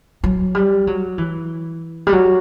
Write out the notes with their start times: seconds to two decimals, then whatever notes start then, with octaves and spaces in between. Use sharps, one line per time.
0.24 F#3
0.55 G3
0.87 F#3
1.18 E3
2.07 G3
2.13 F#3